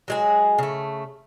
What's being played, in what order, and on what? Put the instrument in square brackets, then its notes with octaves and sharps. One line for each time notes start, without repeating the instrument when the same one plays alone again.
[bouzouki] F#3 G#3 G#4
C#3 A3